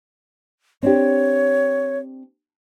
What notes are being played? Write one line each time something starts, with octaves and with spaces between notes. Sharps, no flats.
C4 D4 G4 C#5